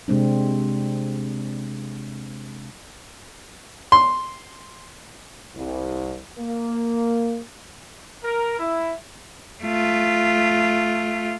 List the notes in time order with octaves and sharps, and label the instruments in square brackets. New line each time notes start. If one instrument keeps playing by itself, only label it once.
[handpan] C3 G#3 C4 D4
[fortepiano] C6
[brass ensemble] C2
A#3
[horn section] A#4
E4
[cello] A3 F4